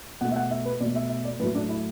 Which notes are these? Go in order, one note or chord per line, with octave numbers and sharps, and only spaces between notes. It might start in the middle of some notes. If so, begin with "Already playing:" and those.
B2 A3 F#5
E5
F#5
E5
B4
B2 A3 D5
E5
E5
D5
A2 F#3 A3 B4
D4
E4